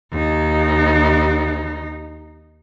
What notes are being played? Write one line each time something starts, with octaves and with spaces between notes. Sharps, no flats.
D#2 D#4